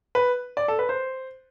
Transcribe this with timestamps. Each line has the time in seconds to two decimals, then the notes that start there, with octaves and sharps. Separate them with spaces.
0.15 B4
0.57 D5
0.68 A4
0.79 B4
0.89 C5